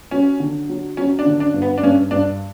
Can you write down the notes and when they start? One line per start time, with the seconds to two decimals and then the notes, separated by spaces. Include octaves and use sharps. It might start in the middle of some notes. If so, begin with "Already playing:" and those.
0.11 F#3 C#4
0.40 D3
0.69 F#3
0.97 F#3 C#4
1.19 D4
1.26 D3
1.40 D4
1.54 G2
1.62 B3
1.78 D4
1.83 G2 C#4
2.11 G2 D4